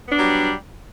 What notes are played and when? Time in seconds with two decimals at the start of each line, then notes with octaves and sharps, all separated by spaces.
0.08 B3
0.12 D4
0.16 F#3
0.19 G3